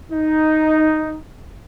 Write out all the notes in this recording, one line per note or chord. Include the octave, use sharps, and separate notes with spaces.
D#4